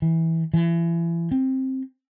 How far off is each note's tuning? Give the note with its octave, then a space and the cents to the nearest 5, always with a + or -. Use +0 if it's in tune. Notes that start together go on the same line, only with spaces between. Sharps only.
E3 -15
E3 +30
C4 +10